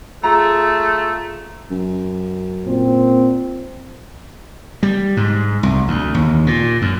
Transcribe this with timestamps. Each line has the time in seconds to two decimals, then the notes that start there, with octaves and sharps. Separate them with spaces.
0.23 A3 F4 G#4 A#5
1.70 F#2
2.66 A#2 C4
4.83 G3
5.17 G#2
5.63 C2
5.88 D2
6.15 D#2
6.47 A#2
6.82 F#2